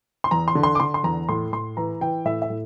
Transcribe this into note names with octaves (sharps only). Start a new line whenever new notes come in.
C6
E2 A#5
C6
D3
C6
D6
D3 C6
C6
E2 A#5
A2 C6
A2 C6
E3 A#5
E3 G5
A2 E5
E5
A2